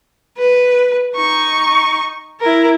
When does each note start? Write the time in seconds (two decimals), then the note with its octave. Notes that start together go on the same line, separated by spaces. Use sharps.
0.38 B4
1.16 D#4 C#6
2.41 E4 A#4